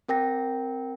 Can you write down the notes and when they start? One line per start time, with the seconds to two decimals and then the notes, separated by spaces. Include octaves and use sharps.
0.08 C4 A#4 G5 A#6